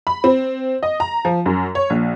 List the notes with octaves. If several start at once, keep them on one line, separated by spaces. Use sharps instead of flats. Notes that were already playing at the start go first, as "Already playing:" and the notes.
B5
C4
D#5
A#5
F3
F#2
C#5
A#1